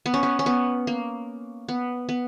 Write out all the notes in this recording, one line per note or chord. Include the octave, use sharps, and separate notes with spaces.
B3
C#4
B3
C#4
B3
A#3
B3
B3